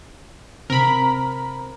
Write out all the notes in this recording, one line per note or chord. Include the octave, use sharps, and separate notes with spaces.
C3 A#4 B5